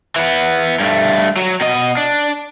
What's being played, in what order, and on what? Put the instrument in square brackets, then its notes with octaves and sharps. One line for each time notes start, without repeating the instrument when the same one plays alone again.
[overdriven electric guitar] E3 B3
G2 A3
F#3
B2 D#5
D4